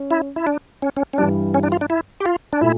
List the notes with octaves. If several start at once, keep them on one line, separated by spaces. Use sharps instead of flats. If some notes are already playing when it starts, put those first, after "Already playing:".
Already playing: C#4
E4
E4
D4
C#4
C#4
C#4
G2 E3 G3 D4
C#4
D4
F4
D4
E4
G4
F4
D4
A#2 A3 E4